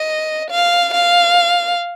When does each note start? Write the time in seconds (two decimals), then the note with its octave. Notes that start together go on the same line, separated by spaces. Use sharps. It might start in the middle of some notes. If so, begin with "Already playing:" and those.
Already playing: D#5
0.51 F5
0.94 F5